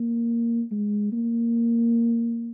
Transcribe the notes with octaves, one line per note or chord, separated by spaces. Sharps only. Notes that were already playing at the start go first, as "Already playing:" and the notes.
Already playing: A#3
G#3
A#3